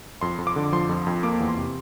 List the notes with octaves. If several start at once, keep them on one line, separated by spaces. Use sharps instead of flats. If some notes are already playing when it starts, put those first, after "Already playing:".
F2 C6
F2
D6
D3
F3 C6
F2
F2
A#3 D6
E2
C6
C3